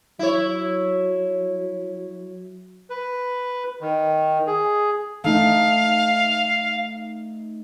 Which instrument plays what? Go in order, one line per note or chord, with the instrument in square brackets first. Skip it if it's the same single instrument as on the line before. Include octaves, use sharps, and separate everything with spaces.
[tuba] F#3 [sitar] E4 C#5
[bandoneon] B4
D#3
G#4
[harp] A3 D#4 [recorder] F5